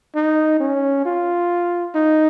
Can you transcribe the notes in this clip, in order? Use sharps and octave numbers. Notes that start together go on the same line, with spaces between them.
D#4
C#4
F4
D#4